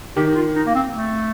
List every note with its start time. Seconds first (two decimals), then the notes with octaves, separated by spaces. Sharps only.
0.17 D#3 G4
0.27 D#4
0.36 F4
0.56 D#4
0.67 A#3
0.75 C4
0.94 A3